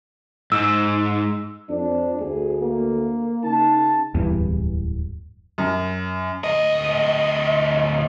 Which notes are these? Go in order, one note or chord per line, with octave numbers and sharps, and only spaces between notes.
G#2 E6
F2 D4
D2 G#4
A#3
C#3 D#4 A5
D1 E2 G2 E3
F#2
D2 D#5